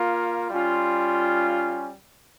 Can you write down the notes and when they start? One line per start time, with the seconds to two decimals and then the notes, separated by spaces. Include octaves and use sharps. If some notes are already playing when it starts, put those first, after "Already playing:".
Already playing: A#3 F4
0.50 G3 C#4 F4